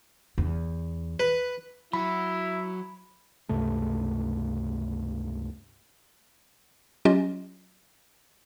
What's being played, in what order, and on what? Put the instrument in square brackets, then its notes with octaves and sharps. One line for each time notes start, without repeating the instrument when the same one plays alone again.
[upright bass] E2
[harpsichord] B4
[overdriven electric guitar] F#3 F#4 [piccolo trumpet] E4 [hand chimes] B5
[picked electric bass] C#2 G2 C3 A3
[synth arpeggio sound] F#3 C#4 F4 G4 D#5